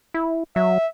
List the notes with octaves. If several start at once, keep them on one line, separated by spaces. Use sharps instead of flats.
E4
F#3 E5